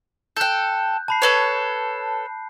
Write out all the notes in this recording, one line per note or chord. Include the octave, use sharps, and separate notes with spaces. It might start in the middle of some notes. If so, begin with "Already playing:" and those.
A4 G5 F#6 G6
A5 B5 C7
A4 B4 C#5